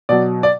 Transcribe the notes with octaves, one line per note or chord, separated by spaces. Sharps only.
B2 F#3 D5
D5